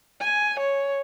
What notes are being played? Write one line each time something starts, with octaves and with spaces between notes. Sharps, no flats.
G#5
C#5